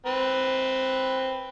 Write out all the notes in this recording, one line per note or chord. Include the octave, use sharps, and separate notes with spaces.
C4 B4